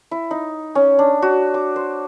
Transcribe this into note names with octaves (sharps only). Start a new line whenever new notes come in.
E4
D#4
C#4
D4
F#4
D6
C5